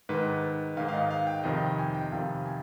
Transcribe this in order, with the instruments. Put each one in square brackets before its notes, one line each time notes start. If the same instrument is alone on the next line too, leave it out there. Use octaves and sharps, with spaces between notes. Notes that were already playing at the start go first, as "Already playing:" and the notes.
[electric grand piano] G#2 D#3 B4
D#3 F5
G#2
F5
D#5
F5
G5
F2 C3 D#3 D#5
G5
G#5
G5
F2 C3 D#3 F5
G#5